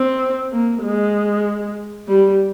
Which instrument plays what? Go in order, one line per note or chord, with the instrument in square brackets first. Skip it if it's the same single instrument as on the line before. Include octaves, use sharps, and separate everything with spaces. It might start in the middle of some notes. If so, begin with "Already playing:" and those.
Already playing: [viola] C4
A#3
G#3
G3